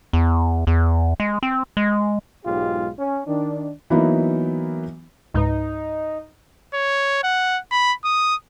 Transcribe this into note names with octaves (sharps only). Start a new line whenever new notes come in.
E2
E2
G#3
C4
G#3
B1 G#2 G#3 F4 G4
C#4
D#3 D4
E3 F#3 A#3 B3 D#4 E4
C#2 G#2 D#4 B4
C#5
F#5
B5
D#6